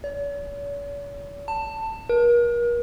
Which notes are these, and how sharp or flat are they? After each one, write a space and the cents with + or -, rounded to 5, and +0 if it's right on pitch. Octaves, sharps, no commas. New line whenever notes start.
C#5 +45
A5 +15
A#4 +40